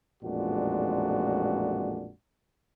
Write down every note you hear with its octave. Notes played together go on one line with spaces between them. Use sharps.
A1 F2 A#2 G#3 D4 F#4